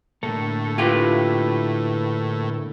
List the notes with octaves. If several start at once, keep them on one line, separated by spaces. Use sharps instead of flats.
A2 D3 A#3 A4
E4 F4 G4 B4